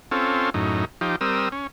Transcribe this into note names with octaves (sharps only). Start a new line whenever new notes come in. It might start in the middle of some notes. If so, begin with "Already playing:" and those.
C4 C#4 F4 A4
F#2 A2 D#4
F3 D#4 G4
G3 C4 A#4 D#6 E6
C#4